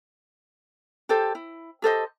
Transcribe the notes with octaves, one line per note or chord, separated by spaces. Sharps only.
G4 A4 C5
E4
G4 A4 C5 D#5